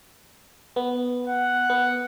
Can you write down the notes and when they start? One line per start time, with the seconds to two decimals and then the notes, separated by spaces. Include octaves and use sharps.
0.76 B3
1.27 F#5
1.70 B3